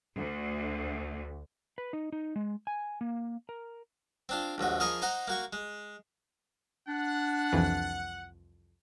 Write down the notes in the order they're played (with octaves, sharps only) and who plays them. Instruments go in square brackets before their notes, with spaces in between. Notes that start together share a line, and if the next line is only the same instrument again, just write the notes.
[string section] D2
[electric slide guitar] B4
D#4
D#4
G#3
G#5
A#3
A#4
[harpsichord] C4 D4 F4
A#1 D#2 G#2 F#4
F3 G#4 A#4 D#5 C#6
D#4 C5 F#5 A#5 C6
A#3 F#4 C#6
G#3
[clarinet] D4 [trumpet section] F#5
[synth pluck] C2 F2 E3